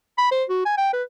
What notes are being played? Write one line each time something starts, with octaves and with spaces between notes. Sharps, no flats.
B5
C5
F#4
G#5
G5
B4